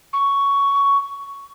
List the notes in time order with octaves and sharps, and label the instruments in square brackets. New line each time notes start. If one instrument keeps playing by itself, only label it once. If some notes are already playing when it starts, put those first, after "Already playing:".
[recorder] C#6